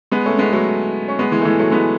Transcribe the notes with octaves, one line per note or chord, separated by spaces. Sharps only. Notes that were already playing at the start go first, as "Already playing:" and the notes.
G#3 B3
A3 C#4
G#3 B3
F#3 A3
C#4
G#3 B3
E3 G#3
A3
E3 G#3
F#3 A3
G#3 B3